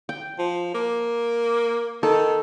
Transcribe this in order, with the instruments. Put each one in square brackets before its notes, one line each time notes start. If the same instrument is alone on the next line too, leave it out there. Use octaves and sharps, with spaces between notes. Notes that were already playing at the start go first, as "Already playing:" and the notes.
[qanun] G5
[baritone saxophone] F3
A#3
[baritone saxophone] D#3 [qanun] A4